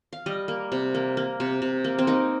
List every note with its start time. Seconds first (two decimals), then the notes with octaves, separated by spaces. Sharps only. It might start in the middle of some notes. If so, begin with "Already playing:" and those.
0.13 F5
0.26 G3 D#5
0.48 A#3
0.72 C3
0.94 A#3
1.17 A#3
1.40 C3
1.62 C3
1.84 A#3
1.98 C4
2.07 A#3 D#4